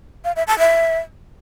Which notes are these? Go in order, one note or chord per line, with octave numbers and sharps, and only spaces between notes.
F5
E5
A5
E5